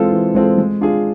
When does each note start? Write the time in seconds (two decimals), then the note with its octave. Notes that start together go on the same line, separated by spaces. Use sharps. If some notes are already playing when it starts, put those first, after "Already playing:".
Already playing: E3 G#3 C4 F4 A4
0.12 E3
0.35 G#3 C4 F4 A4
0.58 G#3
0.81 D4 F4 G#4